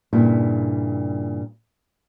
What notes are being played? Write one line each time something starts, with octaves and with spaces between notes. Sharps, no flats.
G2 A#2 C#3 E4